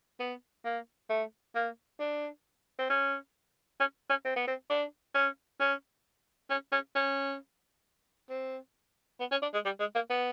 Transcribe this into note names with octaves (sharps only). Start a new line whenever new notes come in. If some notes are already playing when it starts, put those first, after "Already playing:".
B3
A#3
A3
A#3
D4
C4
C#4
C#4
C#4
C4
B3
C4
D4
C#4
C#4
C#4
C#4
C#4
C4
B3
C#4
D4
G#3
G3
G#3
A#3
B3